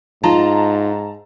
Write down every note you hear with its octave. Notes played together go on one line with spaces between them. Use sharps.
G#2 D#4 F4 A5 A#5